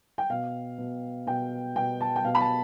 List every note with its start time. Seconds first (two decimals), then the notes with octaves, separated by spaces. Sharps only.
0.18 G5
0.30 B2 F5
0.78 B2
1.27 B2 G5
1.76 B2 G5
2.01 A5
2.16 G5
2.24 B2 F5
2.35 B5
2.40 A5